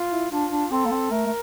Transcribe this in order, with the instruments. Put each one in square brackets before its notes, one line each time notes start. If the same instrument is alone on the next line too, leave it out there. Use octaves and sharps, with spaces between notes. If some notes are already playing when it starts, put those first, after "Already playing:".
Already playing: [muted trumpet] F4
[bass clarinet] E4
[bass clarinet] D4 [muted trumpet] F4
[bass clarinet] D4
[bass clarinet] C4 [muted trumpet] A4
[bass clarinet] A#3
C4
[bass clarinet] A3 [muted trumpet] A#4
[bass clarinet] A3